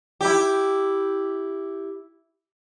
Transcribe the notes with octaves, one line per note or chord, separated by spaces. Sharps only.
E4 G4